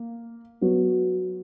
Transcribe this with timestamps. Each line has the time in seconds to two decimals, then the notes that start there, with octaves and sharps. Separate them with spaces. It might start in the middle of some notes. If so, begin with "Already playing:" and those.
Already playing: A#3
0.61 F#3 B3 F#4